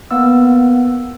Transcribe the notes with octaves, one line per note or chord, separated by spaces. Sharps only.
A#3 B3 F#5 E6